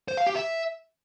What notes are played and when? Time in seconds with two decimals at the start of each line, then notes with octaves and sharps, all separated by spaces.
0.08 C5
0.17 F5
0.27 G4
0.36 E5